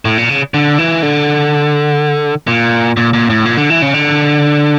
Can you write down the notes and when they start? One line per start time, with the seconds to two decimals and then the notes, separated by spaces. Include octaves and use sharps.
0.05 A2
0.18 A#2
0.29 C#3
0.54 D3
0.79 E3
1.03 D3
2.48 A#2
2.97 A#2
3.13 A#2
3.30 A2
3.45 A#2
3.57 D3
3.70 E3
3.82 C#3
3.94 D3